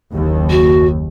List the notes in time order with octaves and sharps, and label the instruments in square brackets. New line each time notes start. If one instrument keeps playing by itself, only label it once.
[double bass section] F#1 D#2
[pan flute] F#4